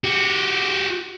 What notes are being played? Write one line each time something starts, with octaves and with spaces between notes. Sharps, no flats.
F#4 G4